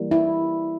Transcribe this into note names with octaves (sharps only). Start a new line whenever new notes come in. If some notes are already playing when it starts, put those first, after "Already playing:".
Already playing: E3 G3 A#3
E4